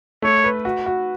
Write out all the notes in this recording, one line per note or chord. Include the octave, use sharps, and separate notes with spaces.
A3 C#5
B4
F#4
F#4